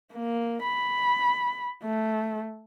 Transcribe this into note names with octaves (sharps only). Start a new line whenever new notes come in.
A#3
B5
A3